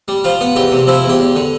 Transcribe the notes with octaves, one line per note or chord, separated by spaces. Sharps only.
G3
F3 F4
B3
E2 G4
C3
F3 E4
E2
G4
E2
D3